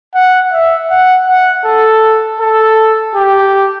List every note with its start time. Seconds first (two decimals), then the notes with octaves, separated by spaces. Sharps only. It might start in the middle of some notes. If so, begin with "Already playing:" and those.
0.15 F#5
0.53 E5
0.90 F#5
1.27 F#5
1.65 A4
2.40 A4
3.15 G4